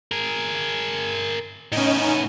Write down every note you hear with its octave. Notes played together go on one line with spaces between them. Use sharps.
G#4 A#4
A2 B3 C#4 D#4